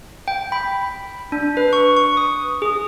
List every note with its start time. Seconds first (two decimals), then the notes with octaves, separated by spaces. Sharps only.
0.28 G5
0.52 B5
1.32 D4
1.57 B4
1.73 C#6
1.97 C#6
2.17 D#6
2.62 G#4